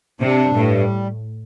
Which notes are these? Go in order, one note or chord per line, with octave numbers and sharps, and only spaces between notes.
C3 D4
G2
A2
G3